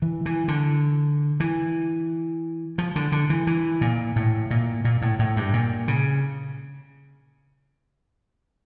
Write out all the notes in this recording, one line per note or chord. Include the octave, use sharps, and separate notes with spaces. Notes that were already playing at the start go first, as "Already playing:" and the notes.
E3
E3
D3
E3
F3
D3
D3
E3
E3
A#2
A2
A#2
A#2
A2
A2
G2
A#2
C#3